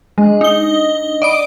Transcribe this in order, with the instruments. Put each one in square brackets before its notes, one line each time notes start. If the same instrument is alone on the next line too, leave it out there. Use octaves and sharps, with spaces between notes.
[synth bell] G#3 [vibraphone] D4 D#5
[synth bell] D#4 G7
[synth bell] D5 D#5 D7 [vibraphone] F#5 B5